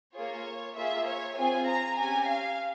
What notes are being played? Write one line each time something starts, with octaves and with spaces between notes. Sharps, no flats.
A#3 F4 G#4 C#5
A#3 F4 G#4 E5
C#5
C4 F4 G#4 G#5
A#5
C#4 G4 G#5
F5